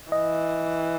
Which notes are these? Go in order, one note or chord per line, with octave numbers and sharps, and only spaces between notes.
E3 D#5